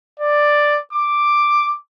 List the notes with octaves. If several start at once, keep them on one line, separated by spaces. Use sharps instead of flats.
D5
D6